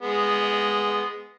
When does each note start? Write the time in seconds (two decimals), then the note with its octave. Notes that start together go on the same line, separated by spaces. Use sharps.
0.03 G#3 B3